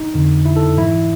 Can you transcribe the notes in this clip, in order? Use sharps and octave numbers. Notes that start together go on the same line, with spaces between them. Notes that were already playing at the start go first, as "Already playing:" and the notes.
Already playing: D#4
F2 D3
E4
A4
G#2 E3 E4